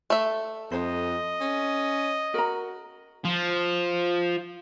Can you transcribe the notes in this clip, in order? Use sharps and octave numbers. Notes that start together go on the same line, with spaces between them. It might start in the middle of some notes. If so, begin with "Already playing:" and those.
A3 E5
F2 C5 D#5
C#4
F#4 A#4 A#5
F3